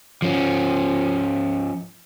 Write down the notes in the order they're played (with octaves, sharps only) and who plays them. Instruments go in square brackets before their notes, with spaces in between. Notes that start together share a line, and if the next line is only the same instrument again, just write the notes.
[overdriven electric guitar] F3 C#4